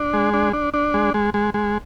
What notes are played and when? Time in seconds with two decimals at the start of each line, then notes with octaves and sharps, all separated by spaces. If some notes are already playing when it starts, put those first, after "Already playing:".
Already playing: D4
0.13 G#3
0.34 D4
0.53 D4
0.74 D4
0.94 G#3
1.14 G#3
1.34 G#3
1.54 G#3